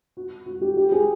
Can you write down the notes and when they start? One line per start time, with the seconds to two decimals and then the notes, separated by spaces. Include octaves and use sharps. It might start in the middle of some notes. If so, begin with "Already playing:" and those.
0.17 F#4
0.46 F#4
0.61 G4
0.77 G4
0.92 G#4